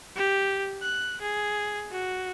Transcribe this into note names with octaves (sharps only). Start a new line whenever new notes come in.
G4
F#6
G#4
F#4